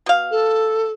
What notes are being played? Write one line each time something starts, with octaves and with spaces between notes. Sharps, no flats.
B2 F5
A4